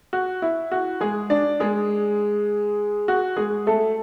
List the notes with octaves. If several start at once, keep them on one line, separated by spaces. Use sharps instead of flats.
F#4
E4
F#4
G#3 G#4
D4 D5
G#3 G#4
F#4
G#3 G#4
A3 A4